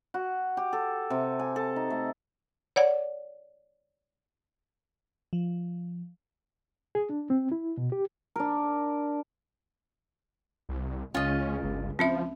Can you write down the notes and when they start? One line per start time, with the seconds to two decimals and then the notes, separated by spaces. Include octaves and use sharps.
0.14 F#4
0.57 G4
0.73 A4
1.10 C3
1.39 G#5
1.56 A4
1.76 D#4
1.90 A3
2.76 C#5 D5 F#5
5.33 F3
6.95 G#4
7.09 D4
7.30 C4
7.52 E4
7.77 B2
7.92 G4
8.36 D4 A#4
10.69 C2
11.14 C#2 C#4 F4 D#5
11.63 G1
11.99 F3 C4 C#4 E5